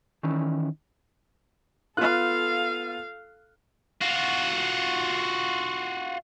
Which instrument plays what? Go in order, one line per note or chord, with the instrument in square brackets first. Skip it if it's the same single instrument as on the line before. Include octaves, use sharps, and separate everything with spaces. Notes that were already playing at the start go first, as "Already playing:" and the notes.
[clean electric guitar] D#3 E3 C#4 E4
[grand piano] B3 F4 F#6 [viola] A4 F5
[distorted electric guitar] F4 F#4